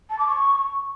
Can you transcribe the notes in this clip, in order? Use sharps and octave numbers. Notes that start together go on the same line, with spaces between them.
A5
D6
C#6